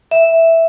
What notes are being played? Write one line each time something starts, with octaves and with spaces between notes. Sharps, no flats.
E5